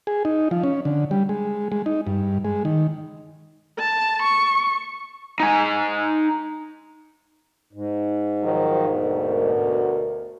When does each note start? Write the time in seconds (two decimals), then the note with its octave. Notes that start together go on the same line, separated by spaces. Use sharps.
0.07 G#4
0.25 D#4
0.51 F3
0.64 C#4
0.85 D3
1.11 G3
1.29 G#3
1.72 G#3
1.86 D#4
2.07 G2
2.45 G#3
2.65 D#3
3.79 A5
4.22 C#6
5.40 D#4 G#5
7.73 G#2
8.43 D#3 F3 F#3
8.89 D2 B2 A#4